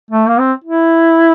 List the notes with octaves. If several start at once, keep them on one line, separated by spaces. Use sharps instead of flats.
A3
A#3
C4
E4